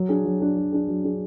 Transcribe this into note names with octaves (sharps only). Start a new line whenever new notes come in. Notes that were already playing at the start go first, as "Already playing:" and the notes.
Already playing: F#3
D4 G#4
F#3
D4 G#4
F#3
D4 G#4
F#3
D4 G#4